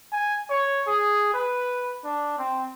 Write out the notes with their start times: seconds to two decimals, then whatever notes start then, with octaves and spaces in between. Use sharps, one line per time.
0.13 G#5
0.50 C#5
0.87 G#4
1.34 B4
2.05 D4
2.38 C4